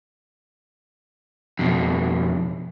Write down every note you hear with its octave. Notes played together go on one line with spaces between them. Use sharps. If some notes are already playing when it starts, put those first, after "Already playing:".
F2 B2